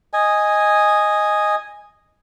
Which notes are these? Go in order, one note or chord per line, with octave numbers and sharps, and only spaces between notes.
D#5 G#5